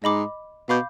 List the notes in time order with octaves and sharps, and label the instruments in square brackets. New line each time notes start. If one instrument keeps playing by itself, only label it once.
[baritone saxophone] G#2 [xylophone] D#5 B5 D6
[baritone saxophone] B2 [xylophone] F5 B5 D6 G6